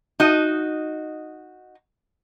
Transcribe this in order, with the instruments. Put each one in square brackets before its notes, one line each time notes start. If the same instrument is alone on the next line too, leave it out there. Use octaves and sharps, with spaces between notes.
[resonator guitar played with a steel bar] D#4 F#4 D#5